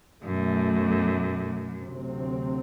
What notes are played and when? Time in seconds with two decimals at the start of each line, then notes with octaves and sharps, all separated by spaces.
0.23 B1 F#2 B2 A3
1.76 D2 C3 F#3 C4